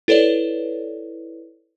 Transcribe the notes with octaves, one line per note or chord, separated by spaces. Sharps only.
E4 A4 B4 C#5 D5